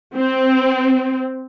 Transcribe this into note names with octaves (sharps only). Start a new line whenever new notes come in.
C4